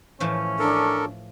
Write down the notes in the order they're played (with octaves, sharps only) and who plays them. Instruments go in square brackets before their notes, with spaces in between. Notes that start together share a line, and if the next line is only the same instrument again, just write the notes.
[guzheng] A2 E3 F3 [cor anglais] C#4
[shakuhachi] D4 [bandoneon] A4 A#4